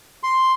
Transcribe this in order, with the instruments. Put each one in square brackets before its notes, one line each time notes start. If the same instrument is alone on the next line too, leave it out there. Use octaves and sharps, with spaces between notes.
[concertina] C6